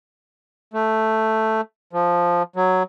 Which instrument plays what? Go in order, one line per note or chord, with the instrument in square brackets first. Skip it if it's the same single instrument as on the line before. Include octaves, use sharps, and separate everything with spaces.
[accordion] A3
F3
F#3